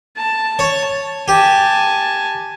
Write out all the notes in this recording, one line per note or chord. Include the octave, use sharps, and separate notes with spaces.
A5
C#5
G4 G#5 A5